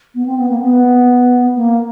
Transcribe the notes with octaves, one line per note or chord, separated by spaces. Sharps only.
B3
C4
B3
A#3
B3
A#3